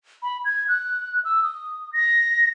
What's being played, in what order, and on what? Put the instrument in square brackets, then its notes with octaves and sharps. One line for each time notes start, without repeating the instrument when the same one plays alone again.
[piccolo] B5
G#6
F#6
E6
D#6
A#6